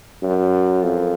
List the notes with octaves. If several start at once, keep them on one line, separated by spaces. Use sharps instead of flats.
F#2
F2